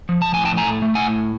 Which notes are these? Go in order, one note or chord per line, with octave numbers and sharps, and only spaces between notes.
F3
A5
A2 G#5
G5 A5
A3 G#5 A#5
A3
F#5 G#5
A2